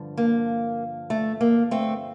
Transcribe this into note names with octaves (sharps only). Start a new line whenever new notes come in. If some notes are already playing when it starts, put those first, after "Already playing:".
Already playing: G2 D3 F3
A#3
A3
A#3
A3 C4